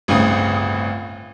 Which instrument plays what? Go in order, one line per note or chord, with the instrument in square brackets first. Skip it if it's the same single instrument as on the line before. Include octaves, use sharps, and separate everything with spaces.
[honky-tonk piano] G1 C2 A2 C#3 C4 D#6